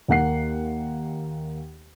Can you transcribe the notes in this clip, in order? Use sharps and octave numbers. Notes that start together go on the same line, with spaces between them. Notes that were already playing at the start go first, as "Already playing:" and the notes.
D#2 A#3 F#5 C7